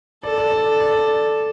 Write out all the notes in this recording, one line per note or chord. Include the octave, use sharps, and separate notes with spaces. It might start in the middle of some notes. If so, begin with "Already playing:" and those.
A4 D5
D5
D5
D5
D5